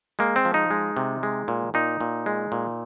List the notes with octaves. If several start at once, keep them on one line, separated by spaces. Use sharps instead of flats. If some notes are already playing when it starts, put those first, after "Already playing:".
G#3 A#3
C4
F3
D#4
G#3
C3
G#3
A#2
A#2 D#4
A#2
G#3
A#2